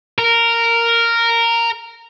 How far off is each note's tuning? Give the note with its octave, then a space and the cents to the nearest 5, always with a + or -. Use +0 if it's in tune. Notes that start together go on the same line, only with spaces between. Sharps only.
A#4 -10